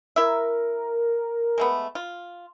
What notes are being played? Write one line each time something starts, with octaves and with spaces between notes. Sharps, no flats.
E4 A#4 E5
G#3 A3 B3
F4